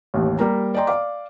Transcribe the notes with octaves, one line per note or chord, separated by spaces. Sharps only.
A1 D#2
G3 A#3 A#5
D5 D#5 G5 A#5 C6
D5 F5 D6